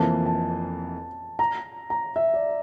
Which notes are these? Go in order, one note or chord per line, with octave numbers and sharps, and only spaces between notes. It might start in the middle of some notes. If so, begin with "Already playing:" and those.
Already playing: F1 F2 E3 A#3 A5
A5
A#5
A#5
E5
D5